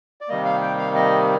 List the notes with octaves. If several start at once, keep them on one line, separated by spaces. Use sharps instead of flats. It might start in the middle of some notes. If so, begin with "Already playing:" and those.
D5
C3 D#3 G3 A#3 D#5
F5
G5
F5
D#5